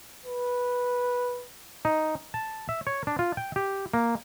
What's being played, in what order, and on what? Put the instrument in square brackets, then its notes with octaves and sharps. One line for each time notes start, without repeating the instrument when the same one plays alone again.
[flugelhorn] B4
[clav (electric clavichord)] D#4
A5
E5
C#5
D4
F4
G5
G4
A#3